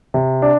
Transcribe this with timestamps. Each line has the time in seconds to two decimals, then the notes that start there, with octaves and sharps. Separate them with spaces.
0.14 C3
0.42 D4